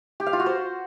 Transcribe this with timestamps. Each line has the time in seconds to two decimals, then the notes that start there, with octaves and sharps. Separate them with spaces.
0.20 G4
0.26 F5
0.33 F4
0.40 F#4
0.46 C5